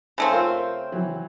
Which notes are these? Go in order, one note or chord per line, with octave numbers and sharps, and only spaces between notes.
C#3 A3 C4
F4 A#4 C5
E3 F#3